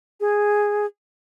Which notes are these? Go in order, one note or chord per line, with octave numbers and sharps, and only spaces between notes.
G#4